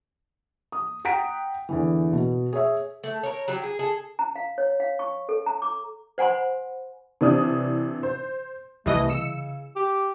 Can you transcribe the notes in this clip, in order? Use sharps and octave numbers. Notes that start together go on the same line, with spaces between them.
D#6
F#5 G5 A#5 B6 D7
E2 D3 E3
B2
G#4 C#5 E5
A3
A#4 C#5
F#3 G3 G4
G#4
G#4 A4
A#5
F5
C#5
F5
C#6
A4
A#5
D6
C5 F#5 G#5 B5 C6
C3 E3 D4 D#6
C5
C2 E3 A3 D#5
C#3 E6 C#7 E7
G4